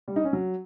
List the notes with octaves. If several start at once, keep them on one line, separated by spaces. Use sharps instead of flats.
G3
D#4
C#4
F#3